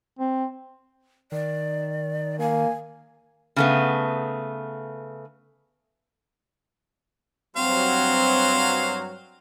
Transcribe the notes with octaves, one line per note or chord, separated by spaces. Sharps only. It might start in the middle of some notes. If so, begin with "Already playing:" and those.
C4
D#3 D5
A#3 G#5
C#3 A3 B3
G2 F#3 C4 C5 F5